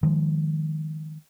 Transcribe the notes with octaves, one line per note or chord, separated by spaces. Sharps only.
D#3 F3 G#3